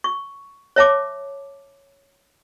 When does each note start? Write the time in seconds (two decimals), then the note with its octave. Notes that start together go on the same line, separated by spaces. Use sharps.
0.04 C#6
0.76 C#5 E5 A5 D6